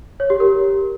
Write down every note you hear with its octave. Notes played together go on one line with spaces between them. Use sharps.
C#5
G4
A#4